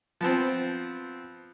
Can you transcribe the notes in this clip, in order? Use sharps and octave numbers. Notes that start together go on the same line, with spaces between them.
F3 B3 C4